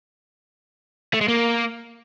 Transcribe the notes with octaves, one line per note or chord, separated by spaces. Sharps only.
A3
G#3
A#3